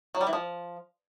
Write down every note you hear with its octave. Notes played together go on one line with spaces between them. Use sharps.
F#3
G3
E3
F3